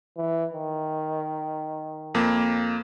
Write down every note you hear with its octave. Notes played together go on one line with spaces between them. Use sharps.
E3
D#3
F2 A#3